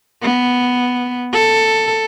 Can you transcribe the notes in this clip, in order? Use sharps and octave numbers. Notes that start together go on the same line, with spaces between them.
B3
A4